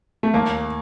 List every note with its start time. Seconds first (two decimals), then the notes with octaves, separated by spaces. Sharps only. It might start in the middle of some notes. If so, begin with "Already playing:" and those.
0.23 A3
0.34 D#2 A#3